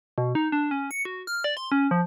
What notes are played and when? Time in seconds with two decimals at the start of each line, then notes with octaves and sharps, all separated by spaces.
0.18 B2
0.35 D#4
0.52 D4
0.71 C#4
0.91 C#7
1.05 F#4
1.27 F6
1.44 D5
1.57 C6
1.72 C#4
1.91 F3